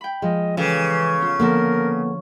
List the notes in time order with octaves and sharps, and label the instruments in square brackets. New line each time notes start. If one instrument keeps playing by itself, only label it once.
[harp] G5 B5
[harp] F3 [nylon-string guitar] G#3 [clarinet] D#5
[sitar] C#3 [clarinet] E3 [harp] G4 A4
[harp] B3 F4
[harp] D3 F3 [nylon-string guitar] A#3 B3 A4 [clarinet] A#4